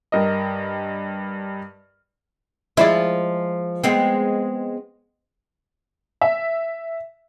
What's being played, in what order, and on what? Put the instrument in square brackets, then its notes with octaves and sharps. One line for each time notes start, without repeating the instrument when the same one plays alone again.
[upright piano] G2 A#4 D#5
[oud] F3 G#3 [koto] E4 D5
[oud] G#3 B3 C4
[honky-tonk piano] E5